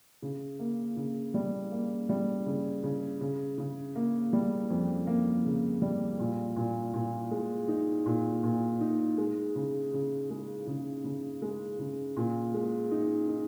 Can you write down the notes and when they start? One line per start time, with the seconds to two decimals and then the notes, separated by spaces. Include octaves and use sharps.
0.22 C#3
0.59 A#3
0.97 C#3
1.34 G3
1.72 A#3
2.09 G3
2.46 C#3
2.83 C#3
3.21 C#3
3.58 C#3
3.95 A#3
4.33 G3
4.70 F2
5.07 A#3
5.45 C#3
5.82 G3
6.20 A#2
6.56 A#2
6.94 A#2
7.31 G#3
7.68 D#4
8.06 A#2
8.43 A#2
8.81 D#4
9.18 G#3
9.55 C#3
9.93 C#3
10.30 G#3
10.67 C#3
11.04 C#3
11.42 G#3
11.79 C#3
12.17 A#2
12.54 G#3
12.91 D#4
13.28 D#4